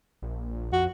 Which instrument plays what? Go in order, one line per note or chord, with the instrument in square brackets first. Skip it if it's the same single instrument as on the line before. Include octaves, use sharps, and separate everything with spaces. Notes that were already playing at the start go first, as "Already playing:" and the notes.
[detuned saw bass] A#1
[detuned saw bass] F2 [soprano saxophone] F#4